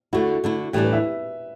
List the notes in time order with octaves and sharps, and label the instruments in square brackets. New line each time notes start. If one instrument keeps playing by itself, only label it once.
[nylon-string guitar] D3 A3 E4 [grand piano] F#4
[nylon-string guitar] D3 A3 E4
[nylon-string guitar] A2 E3 G3 D4 [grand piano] G4
[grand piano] B4
E5